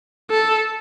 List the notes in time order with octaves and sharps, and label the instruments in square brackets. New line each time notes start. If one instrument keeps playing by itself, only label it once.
[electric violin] A4